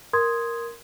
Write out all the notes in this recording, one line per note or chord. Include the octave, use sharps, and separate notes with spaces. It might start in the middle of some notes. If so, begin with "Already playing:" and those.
A#4 C6 D#6 G#6